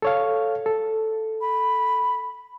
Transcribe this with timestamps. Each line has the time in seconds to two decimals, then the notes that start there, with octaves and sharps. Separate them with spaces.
0.02 A4 C#5 F5
0.66 A4
1.41 B5